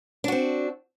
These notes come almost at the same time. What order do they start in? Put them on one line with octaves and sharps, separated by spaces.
D4 F#4 C4